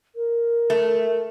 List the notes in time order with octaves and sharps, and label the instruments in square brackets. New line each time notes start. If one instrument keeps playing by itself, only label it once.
[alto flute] A#4
[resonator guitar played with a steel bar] A3